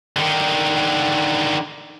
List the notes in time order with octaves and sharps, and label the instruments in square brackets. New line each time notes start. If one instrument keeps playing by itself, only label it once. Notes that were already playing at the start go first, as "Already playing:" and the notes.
[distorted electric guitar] D3 D#3